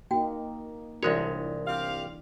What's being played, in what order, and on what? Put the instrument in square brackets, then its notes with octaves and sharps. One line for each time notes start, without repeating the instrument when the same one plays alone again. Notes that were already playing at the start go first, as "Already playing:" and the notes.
[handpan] A#3 D#4 [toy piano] F#4 G5
[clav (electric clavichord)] C2 G#3 C#5 [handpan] E3 D4 [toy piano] F4 F#4 A#4
[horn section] C4 G4 F5